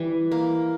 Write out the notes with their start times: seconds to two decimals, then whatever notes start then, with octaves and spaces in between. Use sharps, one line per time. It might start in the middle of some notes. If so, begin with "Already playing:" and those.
Already playing: E3 G3
0.32 A#3